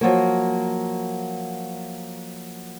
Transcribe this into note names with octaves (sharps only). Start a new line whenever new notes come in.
F3 F#3 A#3